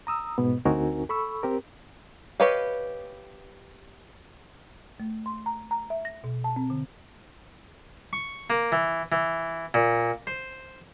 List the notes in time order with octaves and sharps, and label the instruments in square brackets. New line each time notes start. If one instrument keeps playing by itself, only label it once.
[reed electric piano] A#5 D#6 E6
G#2 B2 B3
D2 C4 D#4 F#4 A#4 G#5
A4 B5 C#6 E6
C4 G4 A#4
[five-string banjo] G4 B4 C#5 D#5 F5
[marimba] A3
C6
A#5
A#5
E5
A#6
B2
A5
C4
D3
[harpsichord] C#6
A#3
E3
E3
A#2
C5